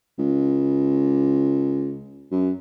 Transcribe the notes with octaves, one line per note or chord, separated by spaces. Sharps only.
C#2
F#2